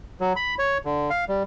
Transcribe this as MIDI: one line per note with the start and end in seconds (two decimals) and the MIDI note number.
0.21 0.33 54
0.36 0.55 83
0.59 0.78 73
0.85 1.10 50
1.10 1.25 77
1.29 1.43 55